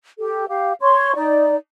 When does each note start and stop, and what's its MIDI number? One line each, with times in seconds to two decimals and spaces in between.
0.19 0.45 67
0.19 0.45 69
0.49 0.72 67
0.49 0.72 77
0.81 1.15 73
0.81 1.15 84
0.81 1.15 85
1.15 1.56 63
1.15 1.56 74